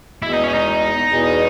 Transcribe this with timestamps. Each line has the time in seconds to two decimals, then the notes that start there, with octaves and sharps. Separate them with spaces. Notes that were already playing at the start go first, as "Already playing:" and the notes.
0.23 E2 B2 G#3 E4
0.33 D#4
0.44 C#4
0.54 D#4
1.08 E2 B2 G#3